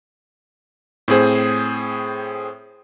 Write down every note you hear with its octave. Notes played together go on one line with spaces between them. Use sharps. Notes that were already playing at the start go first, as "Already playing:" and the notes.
A2 C4 G#4 C5